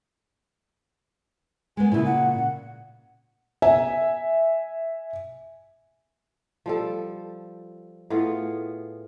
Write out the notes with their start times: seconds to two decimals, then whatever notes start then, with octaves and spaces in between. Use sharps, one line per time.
1.77 G#3 A#3 B3 G#5
1.92 A#2 C#3 E4
2.06 F#5
3.62 E5 G#5
6.66 F3 G3 A4
8.10 A2 B3 F4 G#4